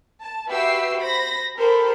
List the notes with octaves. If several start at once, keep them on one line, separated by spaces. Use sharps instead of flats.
A5
F#4 G4 B4 E5 E6 C7
C5 B5 A#6
G4 A4 A#4 C5 B5